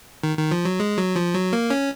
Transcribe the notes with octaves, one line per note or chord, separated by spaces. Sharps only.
D#3
D#3
F3
F#3
G#3
F#3
F3
F#3
A#3
C#4